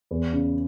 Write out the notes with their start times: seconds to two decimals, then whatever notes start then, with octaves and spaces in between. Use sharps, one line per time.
0.11 E2
0.33 C#3